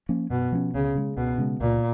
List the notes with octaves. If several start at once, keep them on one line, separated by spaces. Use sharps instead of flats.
F3 A#3 C#4
F#2 B2
F3 A#3 C#4
C#2 C#3
C#3 G#3
C#2 B2
C#3 G#3
C#2 A#2